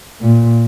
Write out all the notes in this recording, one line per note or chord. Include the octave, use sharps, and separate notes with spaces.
A#2